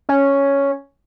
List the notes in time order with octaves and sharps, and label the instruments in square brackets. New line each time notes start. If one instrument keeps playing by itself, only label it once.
[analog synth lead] C#4